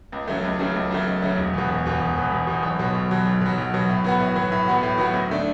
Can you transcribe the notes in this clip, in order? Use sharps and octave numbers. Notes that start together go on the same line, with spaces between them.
C#2
C#3 F#3 A3
C#2
C#3 F#3 A3
C#2
C#3 F#3 A3
C#2
C#3 F#3 A3
E1
E2 B2
E1
E2 B2
E1
E2 B2
E1
E2 B2
B1
B2 F#3
B1
B2 F#3
B1
B2 F#3
B1
B2 F#3
A2
F#3 B3 F#4
A2
F#3 B3 F#4
A2
F#3 B3 F#4
A2
F#3 B3 F#4
D2
D3 A3 D4